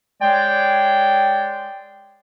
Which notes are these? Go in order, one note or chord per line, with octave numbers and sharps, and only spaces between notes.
G#3 C#5 D5 G5